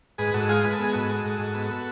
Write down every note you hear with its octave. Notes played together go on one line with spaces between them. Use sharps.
G#2 G#4 B4
G#2 F#4 A4
G#3 F4 G#4
G#3 B4
A4
B3 G#4
G#2 F#4 A4
G#3
G#2
G#2
B3
B3